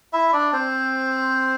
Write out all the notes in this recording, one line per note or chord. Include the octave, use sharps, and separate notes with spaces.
E4 E5
D4 D5
C4 C5